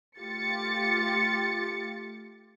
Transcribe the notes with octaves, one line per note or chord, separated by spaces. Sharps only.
A3 F4 G4 A6 C#7